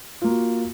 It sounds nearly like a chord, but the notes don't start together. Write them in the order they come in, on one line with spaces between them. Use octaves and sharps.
F4 A#3 F#4